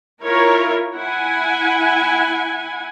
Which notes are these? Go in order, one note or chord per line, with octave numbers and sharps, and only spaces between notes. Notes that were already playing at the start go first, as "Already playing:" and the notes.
E4 F4 A#4 C#5
E4 F#5 G#5